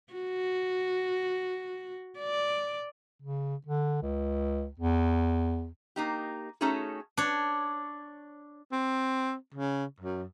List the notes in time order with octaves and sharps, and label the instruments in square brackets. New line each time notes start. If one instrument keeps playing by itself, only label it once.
[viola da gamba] F#4
D5
[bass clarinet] C#3
D3
C#2
E2
[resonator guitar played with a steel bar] A#3 D#4 G4
A3 C#4 D#4 F#4 G#4 A4
[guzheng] D4 C#5
[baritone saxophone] C4
C#3
F#2